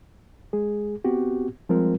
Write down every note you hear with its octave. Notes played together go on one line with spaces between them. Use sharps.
G#3 G#4
B3 C4 F#4 G4
F3 G3 G#3 C4 F4 A#4